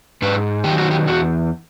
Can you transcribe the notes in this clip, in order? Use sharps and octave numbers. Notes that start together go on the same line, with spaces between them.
G#2 B4
D#3 F#3 G4
F#4
G4
E2 F#4